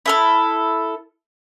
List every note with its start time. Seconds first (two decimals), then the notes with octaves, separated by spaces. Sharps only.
0.06 E4 A4 F6